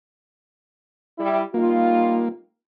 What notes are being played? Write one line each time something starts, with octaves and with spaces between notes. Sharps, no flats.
G3 E4
G3 A#3 D#4 F4